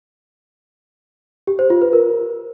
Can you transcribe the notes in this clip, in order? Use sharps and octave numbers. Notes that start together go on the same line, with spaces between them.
G4
C5
F4
B4
A#4